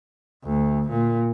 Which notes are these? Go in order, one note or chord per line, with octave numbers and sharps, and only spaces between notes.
D2
A#2